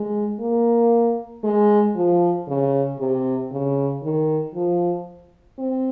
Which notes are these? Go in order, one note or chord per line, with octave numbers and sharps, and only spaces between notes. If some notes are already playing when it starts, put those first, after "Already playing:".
Already playing: G#3
A#3
G#3
F3
C#3
C3
C#3
D#3
F3
C4